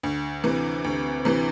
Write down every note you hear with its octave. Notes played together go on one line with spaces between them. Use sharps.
D2
C3 E3
D2
C3 E3